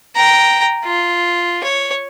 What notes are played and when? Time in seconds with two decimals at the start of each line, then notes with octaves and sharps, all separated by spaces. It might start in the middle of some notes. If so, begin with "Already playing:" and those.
0.16 G5 A#5
0.85 F4
1.64 C#5